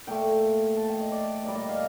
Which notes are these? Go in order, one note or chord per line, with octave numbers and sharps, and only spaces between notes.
A#2 A3 G5
A5
G5
D#5
D5
A#2 G3 D5
D#5
F5